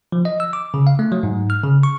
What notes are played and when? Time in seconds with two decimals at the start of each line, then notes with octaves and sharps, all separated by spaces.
0.12 F3
0.25 D#5
0.40 E6
0.53 D6
0.74 C#3
0.87 F5
0.99 A3
1.12 F#3
1.23 G#2
1.50 F6
1.64 C#3
1.83 C#6